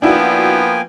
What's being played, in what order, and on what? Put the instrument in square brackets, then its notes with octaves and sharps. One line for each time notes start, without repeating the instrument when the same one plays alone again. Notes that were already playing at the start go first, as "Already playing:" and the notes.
[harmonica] F3 B3 [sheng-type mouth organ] A#3 G5 G#5 [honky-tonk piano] D4 E4 F#4